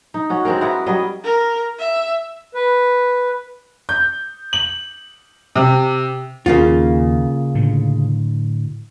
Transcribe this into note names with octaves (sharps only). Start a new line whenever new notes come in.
D#4
C#4 F#4
G#3 C4 C#4 A#4
B3 E4 A#4 F#5
F#3 G3 D#5
A#4
E5
B4
G6
F#7
C3
D#2 C#3 A#3 F4
A2 D3